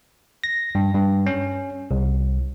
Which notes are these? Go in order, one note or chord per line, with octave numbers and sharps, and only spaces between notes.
A#6
G2
G2
C#4
C2